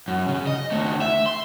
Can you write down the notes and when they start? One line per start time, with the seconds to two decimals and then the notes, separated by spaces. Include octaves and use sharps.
0.08 F#2
0.28 C#3
0.47 D#5
0.72 D#2 A3
1.02 E5
1.26 C6